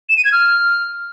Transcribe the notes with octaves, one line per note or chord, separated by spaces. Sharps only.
E7
D#7
G#6
F6